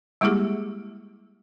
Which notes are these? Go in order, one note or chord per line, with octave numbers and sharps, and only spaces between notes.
G3 G#3 A#3 E4 G4 G#4